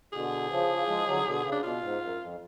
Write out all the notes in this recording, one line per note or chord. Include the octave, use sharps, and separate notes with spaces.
B2 D3 G#4
C#3 F3
F3 G#3
D3 F#3
B2 D3
C#3
D4
B2 F4
G#2
F#2
F2